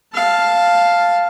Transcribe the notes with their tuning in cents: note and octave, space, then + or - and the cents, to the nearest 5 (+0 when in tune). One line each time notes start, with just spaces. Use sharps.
F5 +0 A5 +0